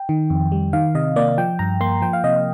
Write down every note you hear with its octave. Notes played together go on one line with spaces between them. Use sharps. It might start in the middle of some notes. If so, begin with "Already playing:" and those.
Already playing: G5
D#3
F2
G3
D#3 F5
C3 D#5
A#3 D5
F3 G5
G2 A#5
A#3 C6
F3 G5
F5
C3 D#5